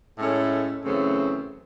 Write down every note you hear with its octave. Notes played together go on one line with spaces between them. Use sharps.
A2 G#3 C#4 E4 A4
F#2 C#3 E3 A3 C4